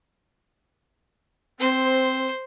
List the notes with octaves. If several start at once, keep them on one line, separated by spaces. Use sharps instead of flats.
C4 C5